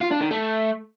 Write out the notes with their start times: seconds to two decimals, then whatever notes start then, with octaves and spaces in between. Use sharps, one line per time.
0.01 F4
0.11 D4
0.21 D#3
0.31 A3